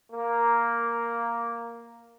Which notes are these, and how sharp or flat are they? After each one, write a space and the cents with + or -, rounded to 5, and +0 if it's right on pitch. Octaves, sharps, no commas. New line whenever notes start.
A#3 +0